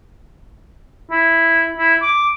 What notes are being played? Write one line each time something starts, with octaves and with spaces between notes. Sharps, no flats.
E4
E4
D6